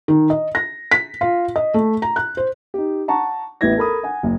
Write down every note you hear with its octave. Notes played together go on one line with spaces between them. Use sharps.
D#3
D#5
A#6
B6
F4
D#5
A3
A#5
F#6
C5
D#4 G4
F#5 A5 A#5 C#6
A1 B3 E4 B4 G#6 A#6
A4 A#4 B5 D#6
F#5 G#5
F#1